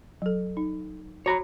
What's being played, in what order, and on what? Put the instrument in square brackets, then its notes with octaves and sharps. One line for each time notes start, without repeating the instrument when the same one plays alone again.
[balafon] F#3 A4
D#4
[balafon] F#4 B5 [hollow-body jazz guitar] C#5 A#5